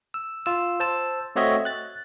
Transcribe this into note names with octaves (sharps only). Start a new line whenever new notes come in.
E6
F4 E6
C5 A5 E6
A3 C4 F#4 C#5 D#5 E5
F#6 A6